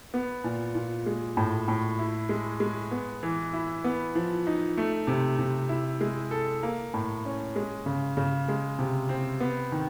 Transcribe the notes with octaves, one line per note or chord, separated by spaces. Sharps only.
B3
A#2
A#2
G#3
A2
A2
E4
G#3
G#3
B3
E3
E4
B3
F3
D#4
A3
C3
C3
E4
G#3
A4
A#3
A2
C#4
G#3
C#3
C#3
G#3
C3
C4
B3
D#3